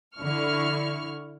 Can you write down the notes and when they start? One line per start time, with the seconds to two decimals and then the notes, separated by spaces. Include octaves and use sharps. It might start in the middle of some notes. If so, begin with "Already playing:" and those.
0.17 D3 E4 C#6 F6